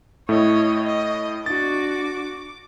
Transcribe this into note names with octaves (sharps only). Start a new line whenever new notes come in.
A2 A3 E4 C#5 D#5
D#5
D4 F#4 D6 A6